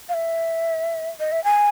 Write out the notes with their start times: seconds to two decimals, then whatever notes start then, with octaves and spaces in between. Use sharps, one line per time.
0.09 F5
0.14 E5
1.20 D#5
1.32 E5
1.44 G#5